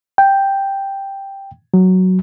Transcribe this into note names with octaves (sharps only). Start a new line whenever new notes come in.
G5
F#3